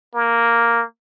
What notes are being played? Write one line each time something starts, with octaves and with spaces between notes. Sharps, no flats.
A#3